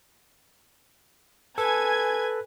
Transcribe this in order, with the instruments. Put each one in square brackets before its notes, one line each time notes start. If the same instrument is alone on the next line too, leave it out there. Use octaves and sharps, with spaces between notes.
[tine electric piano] A4 [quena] B4 [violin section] G#5 G#6